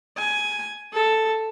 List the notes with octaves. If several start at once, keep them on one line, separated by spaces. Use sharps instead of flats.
G#5
A4